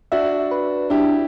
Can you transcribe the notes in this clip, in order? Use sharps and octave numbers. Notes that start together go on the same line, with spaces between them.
D4 F#4 E5
B4
D4 E4 G4